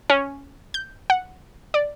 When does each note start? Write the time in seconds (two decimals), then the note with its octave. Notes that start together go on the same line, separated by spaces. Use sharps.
0.10 C#4
0.74 G6
1.10 F#5
1.74 D5